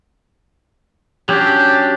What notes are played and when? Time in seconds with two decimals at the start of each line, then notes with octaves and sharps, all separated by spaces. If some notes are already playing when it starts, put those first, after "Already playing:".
1.29 F#3 C#4 D4 G4